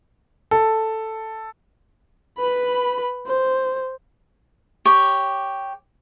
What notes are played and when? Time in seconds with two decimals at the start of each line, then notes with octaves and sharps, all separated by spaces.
0.51 A4
2.40 B4 B5
3.27 C5
4.85 G4 C#5